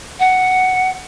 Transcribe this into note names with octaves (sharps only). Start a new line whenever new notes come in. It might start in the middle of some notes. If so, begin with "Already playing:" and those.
F#5